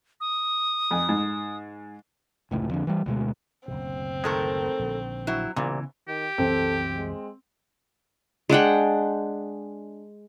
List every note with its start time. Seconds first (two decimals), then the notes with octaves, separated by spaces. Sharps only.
0.21 D#6
0.91 F2 G#5
1.09 G#2
2.51 F1 C#2 A2
2.71 F2 D3
2.87 E3 G3
3.06 D2 B2 G#3
3.68 F#1 D2 B2 C4
4.24 D#3 G#3 A3 A4 A#4
4.79 A#1 D3
5.27 F#3 E4
5.56 C2 A#2 C#3 E3 B3
6.08 D#3 G4
6.38 C2 F#2 E3 C4 A4
6.96 G#3
8.49 G#3 D4 F#5 G5